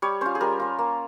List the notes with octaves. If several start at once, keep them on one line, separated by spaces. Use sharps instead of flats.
G3 C#5
C#4 F4 C5
G#4
G3 A#4
C#4 F4
A#3